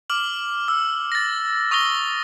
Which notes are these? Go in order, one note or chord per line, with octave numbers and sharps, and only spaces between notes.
D6 F6 F#7
E6
A6 A#6
C#6 D#6 E6 A#6 G7